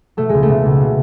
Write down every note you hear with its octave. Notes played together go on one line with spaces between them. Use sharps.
B2 A3
C#2 G#3
A3
B2
C#2
B2